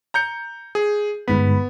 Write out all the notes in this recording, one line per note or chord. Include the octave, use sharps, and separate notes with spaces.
A#5 G6 C#7
G#4
G1 G#2 B3 B5